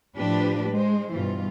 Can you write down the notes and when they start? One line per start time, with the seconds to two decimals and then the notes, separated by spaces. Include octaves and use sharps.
0.17 A2 F3 D4 G4 B4
0.71 G#3 C5
1.13 G2 B2 E3 F4